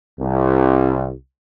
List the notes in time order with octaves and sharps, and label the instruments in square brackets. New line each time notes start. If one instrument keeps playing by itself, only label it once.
[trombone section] C2